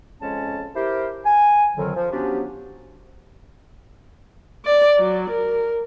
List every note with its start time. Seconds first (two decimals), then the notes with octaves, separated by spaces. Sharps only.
0.21 F2 C#3 G#3 C#4 C#5 A5
0.75 E4 G4 A#4 C5
1.25 G#5
1.76 F2 D3 D#3 F#3
1.95 F3
2.12 F3 F#3 B3 C#4 D4 G4
4.65 D5
4.98 F#3
5.30 A#4